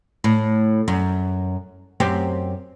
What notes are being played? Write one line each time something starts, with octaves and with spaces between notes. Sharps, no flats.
A2
F#2
F#2 C4 G4